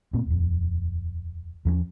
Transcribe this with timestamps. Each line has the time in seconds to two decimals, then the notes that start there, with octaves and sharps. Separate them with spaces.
0.13 A#2 A3 A#3 C4
0.26 D#1 F2
1.65 E2 F3 A#3 C#4